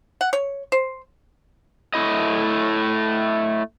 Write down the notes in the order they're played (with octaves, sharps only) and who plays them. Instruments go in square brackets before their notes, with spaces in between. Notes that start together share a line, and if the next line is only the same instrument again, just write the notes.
[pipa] F#5
C#5
C5
[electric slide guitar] A3 E4 D#5